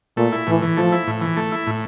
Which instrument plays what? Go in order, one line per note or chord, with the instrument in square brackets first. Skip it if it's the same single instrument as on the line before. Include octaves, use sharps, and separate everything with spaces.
[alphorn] A#2 [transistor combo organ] A3
[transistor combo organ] E4
[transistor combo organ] A2 [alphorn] E3
[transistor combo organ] E3
[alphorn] F3 [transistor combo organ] A3
[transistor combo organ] E4
A2
E3
A3
E4
A2